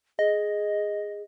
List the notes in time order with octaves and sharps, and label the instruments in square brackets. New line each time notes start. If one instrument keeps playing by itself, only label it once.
[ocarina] G#4 [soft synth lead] D#5